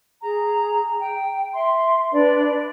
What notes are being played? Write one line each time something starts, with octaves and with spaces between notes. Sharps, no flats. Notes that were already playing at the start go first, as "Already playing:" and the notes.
G#4 A#5
G5
E5 C6
D4 B4 D5